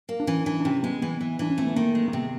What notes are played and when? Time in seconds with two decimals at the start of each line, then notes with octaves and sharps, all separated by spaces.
0.09 A#3
0.20 D4
0.27 E3 C#4
0.46 E3 D4
0.60 D4
0.65 C3 C#4
0.83 G#3 B3
1.02 E3 B3
1.21 E3
1.39 E3 D4
1.50 C#4
1.58 A3 C4
1.67 B3
1.76 D#3 A#3
1.95 G#3
2.08 A#3
2.13 C3 B3